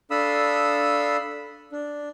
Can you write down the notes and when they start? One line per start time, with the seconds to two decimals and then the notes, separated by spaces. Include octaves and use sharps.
0.11 D4 A4 F5 B5 D#6 E6
1.72 D4